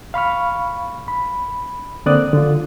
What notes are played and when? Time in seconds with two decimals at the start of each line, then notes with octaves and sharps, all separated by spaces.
0.14 F5 B5 C#6 F6
1.08 B5
2.06 D3 A#3 C4 D5 D#6 F#6
2.33 D3 F4